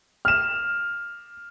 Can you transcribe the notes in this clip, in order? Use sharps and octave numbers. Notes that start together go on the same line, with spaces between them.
F6 E7